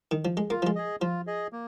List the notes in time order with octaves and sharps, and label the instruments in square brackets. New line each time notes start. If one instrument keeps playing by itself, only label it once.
[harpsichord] D#3
F3
G#3
[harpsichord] A#3 [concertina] F4
[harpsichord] F3
G#3
[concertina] G#4 D#5
[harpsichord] F3 [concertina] F4
[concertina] G#4 D#5
A#3